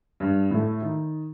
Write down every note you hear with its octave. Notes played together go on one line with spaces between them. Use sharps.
G2
A2 A4
D#3